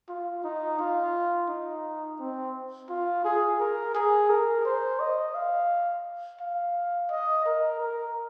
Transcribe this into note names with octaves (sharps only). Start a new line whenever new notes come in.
F4
D#4
F4
D#4
C4
F4
G#4
A#4
G#4
A#4
C5
D#5
F5
F5
D#5
A#4
A#4